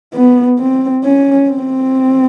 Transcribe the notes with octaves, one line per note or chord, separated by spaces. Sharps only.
B3
C4
C#4
C4